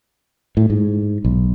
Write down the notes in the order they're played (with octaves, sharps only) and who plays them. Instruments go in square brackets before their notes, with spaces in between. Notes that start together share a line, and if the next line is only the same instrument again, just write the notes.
[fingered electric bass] A2
G#2
B1